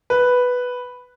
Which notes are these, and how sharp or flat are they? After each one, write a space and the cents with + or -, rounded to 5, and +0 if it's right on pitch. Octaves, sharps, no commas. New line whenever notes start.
B4 +0